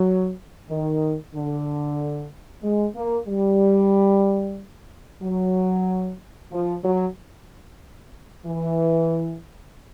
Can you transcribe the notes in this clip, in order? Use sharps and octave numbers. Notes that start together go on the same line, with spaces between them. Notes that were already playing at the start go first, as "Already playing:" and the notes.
Already playing: F#3
D#3
D3
G#3
A#3
G3
F#3
F3
F#3
E3